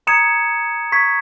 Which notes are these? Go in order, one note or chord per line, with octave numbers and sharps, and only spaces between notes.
A#5 D#6 G#6 C#7 E7
C#6 G#6 B6